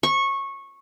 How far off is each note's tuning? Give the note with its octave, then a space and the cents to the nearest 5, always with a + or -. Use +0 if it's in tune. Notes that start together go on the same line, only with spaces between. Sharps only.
C#6 -15